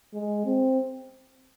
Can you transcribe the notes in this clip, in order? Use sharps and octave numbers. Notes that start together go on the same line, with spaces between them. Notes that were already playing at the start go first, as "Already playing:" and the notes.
G#3
C4